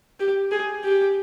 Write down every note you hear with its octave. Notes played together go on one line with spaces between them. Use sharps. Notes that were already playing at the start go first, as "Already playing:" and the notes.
G4
G#4
G4